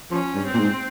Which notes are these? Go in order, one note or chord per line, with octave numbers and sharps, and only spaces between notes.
F3 C#4
G2
C4
A#2
G#2